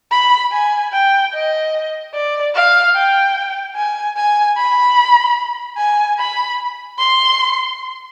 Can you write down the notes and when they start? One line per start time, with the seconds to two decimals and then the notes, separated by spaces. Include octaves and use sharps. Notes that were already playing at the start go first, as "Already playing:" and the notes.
0.12 B5
0.52 G#5
0.93 G5
1.33 D#5
2.14 D5
2.55 F5
2.95 G5
3.75 G#5
4.16 G#5
4.57 B5
5.78 G#5
6.19 B5
6.99 C6